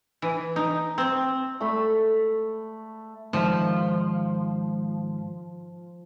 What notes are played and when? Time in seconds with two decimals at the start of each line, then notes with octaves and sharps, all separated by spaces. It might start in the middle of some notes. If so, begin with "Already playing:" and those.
0.22 E3
0.56 D#4
0.98 C4
1.60 A3 B5
3.33 G#2 D#3 F3 E5